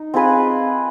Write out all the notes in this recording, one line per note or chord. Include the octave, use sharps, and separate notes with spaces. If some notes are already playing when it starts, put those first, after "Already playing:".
Already playing: D#4
C4 F4 G#4 B4